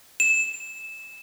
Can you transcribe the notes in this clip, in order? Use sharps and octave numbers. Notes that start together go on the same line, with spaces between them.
E7